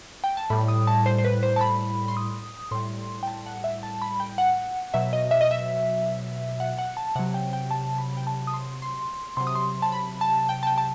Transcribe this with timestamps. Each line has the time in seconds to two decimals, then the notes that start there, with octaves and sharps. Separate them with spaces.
0.24 G5
0.37 A5
0.50 A2 G3 B5
0.68 D#6
0.87 A5
1.06 C5
1.18 C5
1.24 B4
1.43 C5
1.56 A5
1.61 B5
2.08 C6
2.17 D#6
2.71 A2 G3 C6
3.23 G5
3.27 A5
3.46 F#5
3.64 E5
3.83 A5
4.02 B5
4.20 G5
4.38 F#5
4.94 B2 F#3 E5
5.13 D#5
5.31 E5
5.41 D#5
5.51 E5
6.60 F#5
6.79 F#5
6.97 A5
7.16 C3 F#3 F#5
7.34 G5
7.53 G5
7.71 A5
7.98 B5
8.17 G5
8.27 A5
8.47 D#6
8.54 C6
8.82 C6
9.37 C3 F#3 C6
9.47 D#6
9.55 C6
9.82 A5
9.92 B5
10.21 A5
10.49 G5
10.63 A5
10.67 G5
10.78 A5